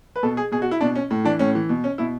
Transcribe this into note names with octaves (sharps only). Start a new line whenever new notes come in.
B4
B2 A4
G#4
B2 G#4
F#4
E4
B2 D4
C#4
A2
E3 D4
A2 C#4
E3
B2
C#4
B2 E4